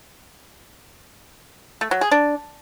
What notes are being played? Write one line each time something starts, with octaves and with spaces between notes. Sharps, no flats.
A3
F#3
G#4
D4